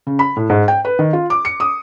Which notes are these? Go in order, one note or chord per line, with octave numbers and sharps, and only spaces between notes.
C#3
B5
A2
G#2
G5
B4
D#3
F4
D6
C#7
D#6